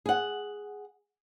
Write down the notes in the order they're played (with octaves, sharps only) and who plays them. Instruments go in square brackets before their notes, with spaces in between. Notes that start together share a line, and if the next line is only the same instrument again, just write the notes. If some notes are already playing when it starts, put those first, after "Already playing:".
[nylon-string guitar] G#4 F#5